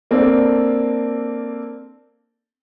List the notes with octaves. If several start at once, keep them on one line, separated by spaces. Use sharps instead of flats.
A#3 C4 D4 A4 C5